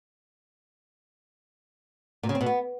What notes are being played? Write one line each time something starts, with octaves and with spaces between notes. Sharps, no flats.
A#2
C#3
C4
B2
B3